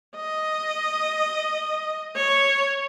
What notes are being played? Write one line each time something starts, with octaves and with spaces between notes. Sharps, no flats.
D#5
C#5